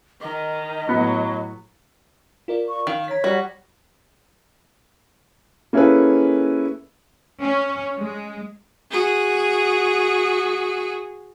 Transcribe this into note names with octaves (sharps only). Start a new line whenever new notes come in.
D#3 D#5
A2 F#3 B3
F4 A#4 D5
C#6
D#3 F5
C#5 A#5 B6
G3 F#4
A#3 C#4 E4 G#4 A4 B4
C#4
G#3
F#4 G#4